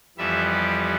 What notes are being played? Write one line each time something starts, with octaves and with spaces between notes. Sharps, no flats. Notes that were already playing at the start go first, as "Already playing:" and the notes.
F2 E3 G3 B3 E5
G4